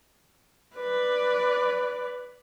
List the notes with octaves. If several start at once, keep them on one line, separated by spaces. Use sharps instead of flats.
B4 D5